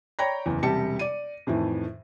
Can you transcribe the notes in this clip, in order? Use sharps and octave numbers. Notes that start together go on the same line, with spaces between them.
C#5 D5 G5 A#5 B5 A#6
F#1 E2
E1 C3 G3 G4 A5 C#7
D5 D#7
F2 A2 D#3 E3